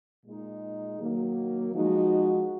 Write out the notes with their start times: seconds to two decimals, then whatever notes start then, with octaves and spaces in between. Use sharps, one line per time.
0.25 A#2 G#3 D#4
0.99 D#3 F#3 A#3
1.72 F3 G#3 D#4 F#4